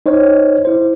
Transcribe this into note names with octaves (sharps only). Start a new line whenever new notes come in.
D#4 C5 C#5 D#5
E4 C5